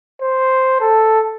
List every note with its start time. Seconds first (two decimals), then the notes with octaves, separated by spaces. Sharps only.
0.22 C5
0.81 A4